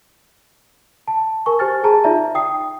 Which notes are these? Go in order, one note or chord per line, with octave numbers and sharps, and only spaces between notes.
A5
A#4 G#5 C#6
G4 C5 G#5 F6 A6
G#4 A5 A#5
D#4 F4 D5 E5 A#5
G5 D#6 C7